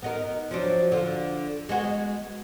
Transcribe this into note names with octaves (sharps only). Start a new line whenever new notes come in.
B3 D#4 A#4
F3 F#3 D4
D3 F4
G#3 B3 F#4